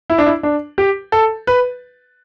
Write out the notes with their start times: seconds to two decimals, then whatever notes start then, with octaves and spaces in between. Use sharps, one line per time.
0.10 E4
0.18 D4
0.26 E4
0.43 D4
0.78 G4
1.12 A4
1.47 B4